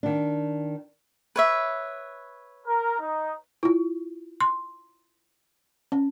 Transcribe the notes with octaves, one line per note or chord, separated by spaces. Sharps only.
D#3 D4
B4 C#5 E5
A#4
D#4
E4 F4
C6
C#4